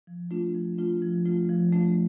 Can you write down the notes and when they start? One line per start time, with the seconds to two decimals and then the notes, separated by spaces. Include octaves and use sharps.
0.07 F3
0.31 A3 D4 F4
0.55 F3
0.78 A3 D4 F4
1.02 F3
1.25 A3 D4 F4
1.49 F3
1.72 A3 D4 F4